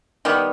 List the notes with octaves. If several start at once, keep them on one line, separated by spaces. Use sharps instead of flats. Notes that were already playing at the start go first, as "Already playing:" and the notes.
D#3 G3 B3